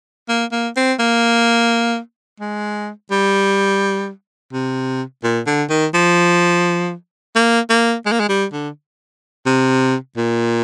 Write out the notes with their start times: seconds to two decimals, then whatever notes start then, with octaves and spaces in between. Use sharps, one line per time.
0.29 A#3
0.52 A#3
0.76 C4
0.99 A#3
2.40 G#3
3.11 G3
4.53 C3
5.23 A#2
5.47 D3
5.70 D#3
5.94 F3
7.35 A#3
7.70 A#3
8.06 G#3
8.12 A#3
8.20 G#3
8.29 G3
8.52 D3
9.46 C3
10.17 A#2